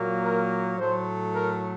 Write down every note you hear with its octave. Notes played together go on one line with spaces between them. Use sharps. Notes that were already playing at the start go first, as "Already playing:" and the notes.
Already playing: A#2 F#3 A#3
A#4
A2 F#3 A3 C5
A#4